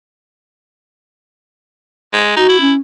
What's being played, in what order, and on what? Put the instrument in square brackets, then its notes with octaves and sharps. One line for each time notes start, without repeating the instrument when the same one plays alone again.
[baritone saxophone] G#3
[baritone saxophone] D#4 [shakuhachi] F#4
[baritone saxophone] E4
[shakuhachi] C#4